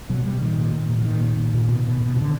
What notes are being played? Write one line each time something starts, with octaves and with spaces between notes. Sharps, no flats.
B2 F#3
B2 G3
A#2 D#3
A#2
A#2
A#2
E3
A#2 D#3
A#2
A#2
A#2
B2
B2
B2
B2
D3